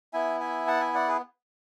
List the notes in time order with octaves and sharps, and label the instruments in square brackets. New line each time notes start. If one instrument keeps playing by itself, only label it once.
[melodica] B3 E4 E5 G#5
E5 G#5
F#5 A5
E5 G#5
D5 F#5
G#4 B4